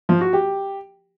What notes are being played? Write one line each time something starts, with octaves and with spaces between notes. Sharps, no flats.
F3
F#4
G4